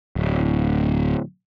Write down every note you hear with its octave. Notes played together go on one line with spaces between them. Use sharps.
D1